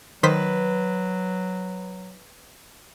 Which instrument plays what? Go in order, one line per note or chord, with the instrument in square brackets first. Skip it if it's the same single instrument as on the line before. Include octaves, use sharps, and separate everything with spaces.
[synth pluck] D#3 C5 B6 [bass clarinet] F#3 [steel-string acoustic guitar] B4